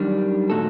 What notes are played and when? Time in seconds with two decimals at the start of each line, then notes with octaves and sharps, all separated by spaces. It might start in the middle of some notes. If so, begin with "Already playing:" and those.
Already playing: F#2 D#3 G3 D4
0.50 A#2 A3 D#4 F#4 A4